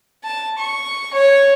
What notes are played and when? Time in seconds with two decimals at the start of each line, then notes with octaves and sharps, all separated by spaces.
0.24 A5
0.58 C#6
1.13 C#5